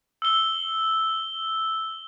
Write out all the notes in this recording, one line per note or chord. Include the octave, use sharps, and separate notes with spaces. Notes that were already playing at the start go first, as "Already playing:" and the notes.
E6 G7